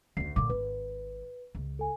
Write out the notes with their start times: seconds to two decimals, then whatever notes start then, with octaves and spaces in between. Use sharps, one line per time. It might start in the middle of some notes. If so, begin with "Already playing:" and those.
0.17 D2 C#4 C7
0.36 A#2 D3 D6
0.50 G#1 B4
1.55 C#2
1.79 A4 G#5